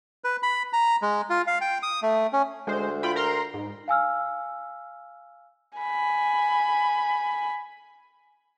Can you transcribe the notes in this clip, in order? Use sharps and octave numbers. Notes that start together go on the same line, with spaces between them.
B4
B5
A#5
G#3
F4
F5
G5
D#6
A3
C#4
D2 G#3 C5
F4 G5 B5
A#4 A#5 C6
G#2
F5 G#5 E6 F6
G#5 B5